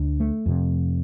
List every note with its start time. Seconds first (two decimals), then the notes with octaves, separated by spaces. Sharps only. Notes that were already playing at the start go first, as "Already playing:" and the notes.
Already playing: D2 D3
0.20 A3
0.46 F2 C3